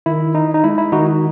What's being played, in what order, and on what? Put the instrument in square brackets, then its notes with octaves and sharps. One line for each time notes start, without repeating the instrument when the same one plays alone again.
[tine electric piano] D#3 E4
D#4
D#4
G#3 E4
E4
D#3 D#4 F#4